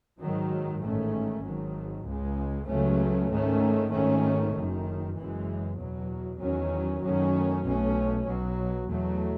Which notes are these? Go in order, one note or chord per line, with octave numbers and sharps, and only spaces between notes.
G#2 D#3 F#3
A1 G#2 D#3 A3 C#4
G#1 G#2 D#3 F#3
C#2 C#3 G#3
C#2 C#3 F#3 A3 C#4
G#2 D#3 A3 C#4
G#1 G#2 D#3 A3 C#4
F#1 F#2 D#3
F#1 F#2 E3 G#3
E2 B2 F#3
E2 D#3 F#3 C#4
F#2 D#3 F#3 A3 C#4
B1 B2 A3 C#4
B1 B2 F#3
E2 B2 F#3 A3